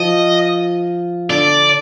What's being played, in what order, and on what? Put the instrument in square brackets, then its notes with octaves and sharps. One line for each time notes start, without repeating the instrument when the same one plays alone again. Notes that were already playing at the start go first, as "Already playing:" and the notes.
Already playing: [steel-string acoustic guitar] F3 [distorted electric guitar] D#5
[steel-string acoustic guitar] D3 [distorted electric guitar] D5